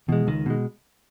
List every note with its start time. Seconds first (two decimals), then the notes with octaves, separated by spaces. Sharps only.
0.09 B2 E3 G#3
0.27 C#2 D#3
0.46 B2 G#3